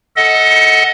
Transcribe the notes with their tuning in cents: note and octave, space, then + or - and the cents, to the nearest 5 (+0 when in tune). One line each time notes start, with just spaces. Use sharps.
A4 +0 D#5 +25 F#5 +0